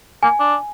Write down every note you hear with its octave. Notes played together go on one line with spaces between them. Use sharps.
A#3 G#5
D4